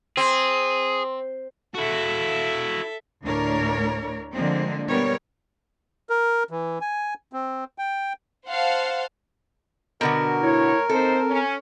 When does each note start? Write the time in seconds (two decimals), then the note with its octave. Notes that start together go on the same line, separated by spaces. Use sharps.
0.17 C4 G#4 C6
1.75 E4 F#4 A4 E5
3.23 D2 A2 D4 A#4 C#5
4.33 D3 F3 G#3 A#3 C4
4.88 B2 G3 B3 A#4 C#5
6.10 A#4
6.51 E3
6.81 G#5
7.33 C4
7.78 G5
8.47 C5 F5 F#5 A5
10.01 B2 D3 F#4 A#4
10.42 A2 E4 C#5
10.89 D#2 C4 D#4 A4 C5
11.29 C#4